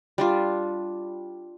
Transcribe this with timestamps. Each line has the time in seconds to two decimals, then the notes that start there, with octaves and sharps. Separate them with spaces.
0.18 G3 D4 F4